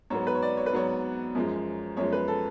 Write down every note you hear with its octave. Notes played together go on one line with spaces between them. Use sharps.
G#2 F#3 B3 C#5
B4
C#5
D5
C#5
B4
G#2 F#3 B3 C#5
F#2 F3 G#3
F#2 F3 G#3 C#5
B4
A4